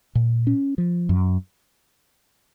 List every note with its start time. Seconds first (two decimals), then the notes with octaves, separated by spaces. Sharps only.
0.15 A#2
0.47 C#4
0.78 F3
1.09 F#2